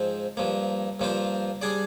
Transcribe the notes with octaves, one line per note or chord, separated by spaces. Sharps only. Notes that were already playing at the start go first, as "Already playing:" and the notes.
Already playing: G#2 F3 C4
G2 F3 A#3
G2 F3 A#3 F4 C5
G3 D4 G#4 D5